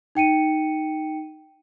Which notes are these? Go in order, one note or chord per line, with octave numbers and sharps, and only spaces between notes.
D#4 G5 C#7 D#7